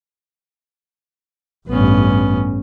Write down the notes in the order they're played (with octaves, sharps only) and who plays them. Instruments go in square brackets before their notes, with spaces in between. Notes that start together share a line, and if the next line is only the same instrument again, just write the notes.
[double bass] A1 G2 [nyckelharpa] B3 C#4